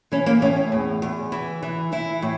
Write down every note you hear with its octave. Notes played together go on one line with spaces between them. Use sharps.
E3 C#4
A#3
A2 C#4
E2
E2
E3
E3
E3 E4
A2